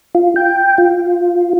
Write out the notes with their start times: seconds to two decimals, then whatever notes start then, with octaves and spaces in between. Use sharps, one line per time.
0.15 F4
0.36 G5
0.78 F4